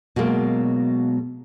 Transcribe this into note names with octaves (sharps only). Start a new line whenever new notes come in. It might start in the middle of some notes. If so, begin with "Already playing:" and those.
B2 F#3 G#3 A#3